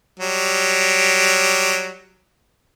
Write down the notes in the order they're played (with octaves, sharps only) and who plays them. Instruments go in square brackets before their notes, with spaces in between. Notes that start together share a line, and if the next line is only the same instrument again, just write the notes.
[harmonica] F#3 G3